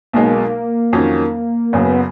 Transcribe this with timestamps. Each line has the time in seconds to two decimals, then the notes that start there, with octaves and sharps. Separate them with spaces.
0.13 B1 B2 G#3 A#3 D#4
0.93 F2 D#3 F#3 C#4
1.73 F#1 F#2 C#3 B3